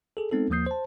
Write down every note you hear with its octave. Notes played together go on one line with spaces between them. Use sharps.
G#4 A4
G#3 B3 C4 D#4 A4
D#2 F3 A#3 D#6 G6 C7
C5 A5